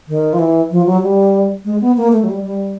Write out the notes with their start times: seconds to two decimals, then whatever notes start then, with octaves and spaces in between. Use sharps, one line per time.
0.08 D#3
0.33 F3
0.39 E3
0.71 F3
0.86 F#3
1.03 G3
1.65 G#3
1.81 B3
1.97 A#3
2.12 A3
2.23 F#3
2.29 G3
2.44 G3